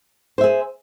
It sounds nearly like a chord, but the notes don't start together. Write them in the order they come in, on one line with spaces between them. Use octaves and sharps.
C5 E5 G#4